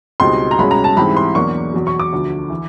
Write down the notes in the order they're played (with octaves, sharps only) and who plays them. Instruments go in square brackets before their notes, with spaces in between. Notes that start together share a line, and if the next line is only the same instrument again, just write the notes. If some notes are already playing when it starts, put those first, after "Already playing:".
[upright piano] C#2 B2 G3 C4 D#4 C6
A#5
C2 B2 G#3 C#4 B5
A#5
A5
G#2 E3 G3 C4 E4 B5
C6
E2 B2 F#3 A#3 D4 C#6
E2 B2 F#3
C#6
D6
D2 D3 F3
E3